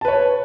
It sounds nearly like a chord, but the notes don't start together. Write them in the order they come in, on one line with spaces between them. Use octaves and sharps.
A5 B4 C#5